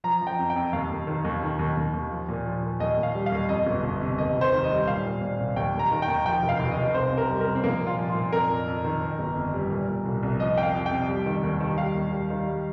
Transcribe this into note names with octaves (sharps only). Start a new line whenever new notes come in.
F3 A#5
F3
G5
F2
G5
F2
D#2 F5
D#2
D#3
D#2
D#3
D#2
D#2
D#2
F3
A#2
F3
A#2
D#2 D#5
D#2
F5
G3
F5
D#2
F2 D#5
G1
G1
C3
D#2 D#5
F1
C5
D#3
D#5
G3
A#2 F5
A#2
A#2
C2
D#2 G5
D#2
A#5
D#3
G5
D#2
F3 G5
F1
F5
F1
D#5
F1
C2 C5
C3
A#4
G3
A#4
C3
C4
F3 A#3
A#2
F4
F3
F4
A#2
F2 A#4
F2
F2
D#3
D#3
G1
F2
G3
A#2
A#2
C2
C2
F3 D#5
F2 G5
F5
F2
G5
C3
G3
D#3
D#2
D#3
G3 F5
D#2
G3
D#3
G3